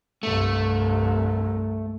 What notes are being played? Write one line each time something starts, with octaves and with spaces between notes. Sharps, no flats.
C2 G2 A3